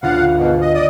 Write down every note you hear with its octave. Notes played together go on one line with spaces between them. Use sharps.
D2 D3 F4 F5 F#5
G#2 B2
D#5
D5 D#5 D#6